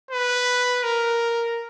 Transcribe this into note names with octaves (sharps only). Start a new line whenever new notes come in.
B4
A#4